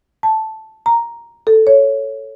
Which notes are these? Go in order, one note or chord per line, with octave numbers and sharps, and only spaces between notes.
A5
A#5
A4
C#5